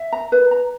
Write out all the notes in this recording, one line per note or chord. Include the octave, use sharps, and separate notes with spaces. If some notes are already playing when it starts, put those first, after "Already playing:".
Already playing: E5
A#5
B4
A#5